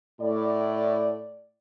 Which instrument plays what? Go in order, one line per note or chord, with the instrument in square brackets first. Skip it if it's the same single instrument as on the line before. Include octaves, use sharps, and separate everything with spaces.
[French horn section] A2 D5